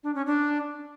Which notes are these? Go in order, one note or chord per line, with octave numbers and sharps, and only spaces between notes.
D4
C#4
D4